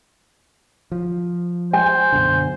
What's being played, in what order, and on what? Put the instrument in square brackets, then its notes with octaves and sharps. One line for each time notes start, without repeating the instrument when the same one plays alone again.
[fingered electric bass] F3
[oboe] C5 [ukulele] G#5
[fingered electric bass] F#2 B2 D3